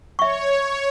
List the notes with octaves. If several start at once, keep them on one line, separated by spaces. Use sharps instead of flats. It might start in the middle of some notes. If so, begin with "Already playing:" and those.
C#5 E5 C#6